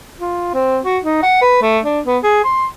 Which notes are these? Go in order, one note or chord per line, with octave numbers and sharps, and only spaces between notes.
F4
C4
F#4
D#4
F#5
B4
A3
D4
B3
G#4
C6